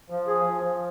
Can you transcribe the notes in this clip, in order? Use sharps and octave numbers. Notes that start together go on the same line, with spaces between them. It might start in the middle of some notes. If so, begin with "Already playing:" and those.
F3
G#4
F3
F3